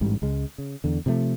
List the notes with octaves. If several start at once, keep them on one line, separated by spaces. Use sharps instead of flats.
A1 G#2 G3
C#2 C#3 G#3
C#3
E2 D3
C3 F3 G3 A3